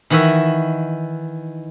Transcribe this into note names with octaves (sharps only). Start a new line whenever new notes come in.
D#3 E3 F#4 D#5 E5